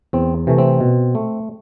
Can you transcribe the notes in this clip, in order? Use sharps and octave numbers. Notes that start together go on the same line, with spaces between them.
E2 C4
C3 E3 A3
C4
B2
A3